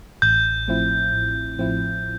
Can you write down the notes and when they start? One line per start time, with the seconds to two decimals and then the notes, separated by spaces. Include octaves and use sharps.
0.22 A1 G6
0.68 A2 F3 C4 E4
1.13 A1
1.58 A2 F3 C4 E4